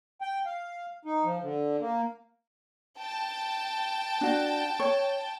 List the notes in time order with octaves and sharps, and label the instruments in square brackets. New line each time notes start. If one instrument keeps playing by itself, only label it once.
[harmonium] G5
F5
D#4
F3
D3
A#3
[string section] G5 A5
[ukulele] D4 F#4
C#5